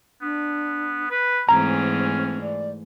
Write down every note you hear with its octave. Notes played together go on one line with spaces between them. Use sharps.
B3 D4
B4
G#2 E3 A3 C4 C#4 A#5
D5